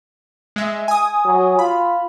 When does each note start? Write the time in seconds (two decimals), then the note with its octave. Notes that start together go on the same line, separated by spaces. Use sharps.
0.56 G#3 E5
0.88 G#5 D#6
1.25 F#3
1.59 F4 B5